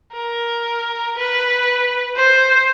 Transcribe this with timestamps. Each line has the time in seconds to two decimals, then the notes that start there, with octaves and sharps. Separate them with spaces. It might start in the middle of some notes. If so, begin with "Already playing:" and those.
0.13 A#4
1.17 B4
2.17 C5